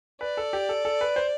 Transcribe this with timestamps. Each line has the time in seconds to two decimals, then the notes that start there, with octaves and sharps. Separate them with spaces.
0.21 B4 D5
0.37 A4
0.53 G4
0.69 A4
0.85 A4
1.01 B4
1.16 C5